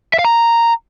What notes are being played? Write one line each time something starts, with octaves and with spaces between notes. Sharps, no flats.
E5
F5
A#5